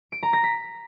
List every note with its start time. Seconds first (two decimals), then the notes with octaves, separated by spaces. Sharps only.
0.12 D7
0.23 A#5
0.33 A#6
0.43 B6